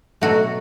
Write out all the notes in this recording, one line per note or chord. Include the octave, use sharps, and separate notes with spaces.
B2 F#3 A3 F#4